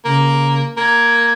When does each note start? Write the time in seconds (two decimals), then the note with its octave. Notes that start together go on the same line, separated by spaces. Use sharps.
0.05 C#3 A#3
0.77 A#3 G#6